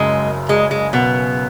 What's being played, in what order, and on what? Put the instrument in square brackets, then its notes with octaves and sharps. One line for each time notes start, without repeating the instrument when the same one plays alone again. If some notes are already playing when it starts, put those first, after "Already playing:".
Already playing: [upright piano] F#1 F#2 C#3 [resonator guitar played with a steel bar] G#3
[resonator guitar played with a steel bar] G#3
G#3
B2 B3